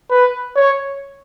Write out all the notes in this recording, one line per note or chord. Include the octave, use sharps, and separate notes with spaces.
B4
C#5